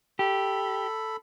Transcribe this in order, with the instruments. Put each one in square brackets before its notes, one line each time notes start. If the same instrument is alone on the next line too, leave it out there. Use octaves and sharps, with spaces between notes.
[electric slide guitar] G4 [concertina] A4 B5